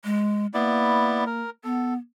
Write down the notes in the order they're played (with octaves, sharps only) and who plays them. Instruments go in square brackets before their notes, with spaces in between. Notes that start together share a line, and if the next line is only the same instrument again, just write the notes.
[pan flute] G#3
[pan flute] A#3 [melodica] B3 E4 D5
[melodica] A#4
[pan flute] B3 [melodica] A4